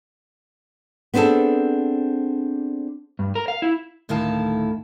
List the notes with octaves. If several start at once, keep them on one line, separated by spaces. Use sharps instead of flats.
B3 C4 D4 G#4 A4
G2
A#4
F5
E4
D2 A2 D#3 E4 F5 A5